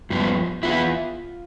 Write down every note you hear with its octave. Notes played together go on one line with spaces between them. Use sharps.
G2 F3 B3 F4
E3 B3 E4 F4